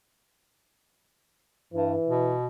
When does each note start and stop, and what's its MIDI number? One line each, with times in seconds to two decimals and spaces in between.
1.73 1.94 43
1.73 2.36 52
2.07 2.48 47